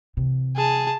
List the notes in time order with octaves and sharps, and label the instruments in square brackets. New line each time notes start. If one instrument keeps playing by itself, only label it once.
[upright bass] C3 E3
[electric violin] G#4 A5